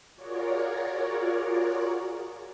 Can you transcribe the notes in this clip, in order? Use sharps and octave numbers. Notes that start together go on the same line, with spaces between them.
F4 F#4 G#4 A#4 C#5 D5